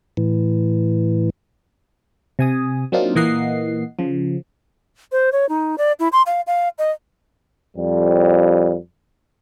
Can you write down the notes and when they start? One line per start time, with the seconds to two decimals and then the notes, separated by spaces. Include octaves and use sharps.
0.17 A2 E3
2.39 C3 G#5 D#6
2.92 F#3 A#3 C4 D4 D#4 F4
3.15 A#2 E3 A#3 D#5 F#5 C7
3.99 C#3 F3
5.12 C5
5.32 C#5
5.49 D#4
5.78 D5
5.99 E4
6.12 C6
6.26 F5
6.47 F5
6.78 D#5
7.76 F2 G3